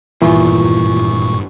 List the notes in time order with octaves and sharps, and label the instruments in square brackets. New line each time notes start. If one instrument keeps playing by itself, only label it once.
[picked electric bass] G#1 G2 A#3 [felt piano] E2 [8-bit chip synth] A#2 C#6 [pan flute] F4